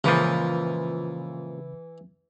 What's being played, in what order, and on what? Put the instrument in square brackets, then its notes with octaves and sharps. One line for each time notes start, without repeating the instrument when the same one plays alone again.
[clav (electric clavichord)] C#2 A#2 F3 [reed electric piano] C#3 B5 A6 [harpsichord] E3